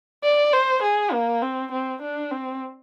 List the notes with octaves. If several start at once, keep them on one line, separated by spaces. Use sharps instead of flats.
D5
C5
G#4
A#3
C4
C4
D4
C4